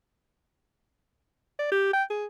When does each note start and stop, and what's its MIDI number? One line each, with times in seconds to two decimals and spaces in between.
1.59 1.68 74
1.72 1.90 67
1.93 2.03 79
2.10 2.26 68